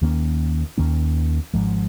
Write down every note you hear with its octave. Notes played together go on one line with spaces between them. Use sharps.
D#2 D#3 A#3 C#4
D#2 D#3 A#3 C#4
G#1 G#2 F3 G#3